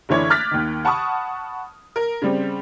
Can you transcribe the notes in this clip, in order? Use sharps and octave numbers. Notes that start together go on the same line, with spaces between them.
F#1 D3 E3 C#5 D5 G#6
D6 F6 F#6 A6 B6
D#2 D#3
F#5 A5 B5 C#6 D#6
A#4
C#3 G3 C4